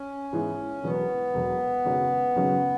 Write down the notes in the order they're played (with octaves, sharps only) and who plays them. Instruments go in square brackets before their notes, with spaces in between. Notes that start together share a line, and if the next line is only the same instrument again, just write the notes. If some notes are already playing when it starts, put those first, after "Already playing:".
Already playing: [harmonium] C#4
[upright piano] G#2 E3 B3 E4 G#4
[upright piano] E1 E2 B2 F#3 [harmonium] B3
[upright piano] E1 E2 B2 F#3
G#1 F#2 C#3 F#3 C#4
G#1 F#2 C#3 F#3 C#4